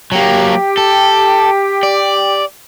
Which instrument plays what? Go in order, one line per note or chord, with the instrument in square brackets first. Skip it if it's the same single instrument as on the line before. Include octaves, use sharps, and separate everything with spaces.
[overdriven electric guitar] F#3 A#3 [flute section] G4 G5
[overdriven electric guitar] A4
D5